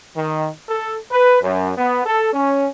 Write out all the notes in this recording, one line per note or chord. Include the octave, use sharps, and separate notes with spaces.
D#3
A4
B4
F#2
B3
A4
C#4